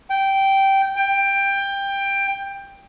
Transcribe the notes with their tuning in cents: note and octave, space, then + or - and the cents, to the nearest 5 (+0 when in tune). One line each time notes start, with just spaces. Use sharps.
G5 -10
G5 +15